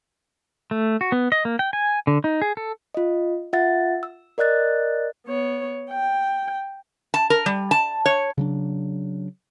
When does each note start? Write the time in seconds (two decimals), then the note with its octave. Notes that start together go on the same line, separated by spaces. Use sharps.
0.71 A3
1.01 F#4
1.12 B3
1.32 D#5
1.45 A#3
1.59 G5
1.73 G#5
2.07 D3
2.24 D#4
2.42 G#4
2.57 A4
2.95 F4 D#5
3.53 F4 E5 F#5 A6
4.03 E6
4.38 A#4 D5 D#5 F#6 A6
5.27 B3 C#5
5.91 G5
7.14 A5
7.30 A#4
7.46 G3
7.71 A5
8.06 C#5
8.38 C#3 F#3 D4